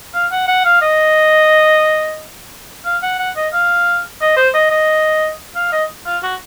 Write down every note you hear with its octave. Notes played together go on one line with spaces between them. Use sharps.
F5
F#5
F#5
F5
D#5
F5
F#5
F#5
D#5
F5
D#5
C5
D#5
D#5
F5
D#5
F4
F#4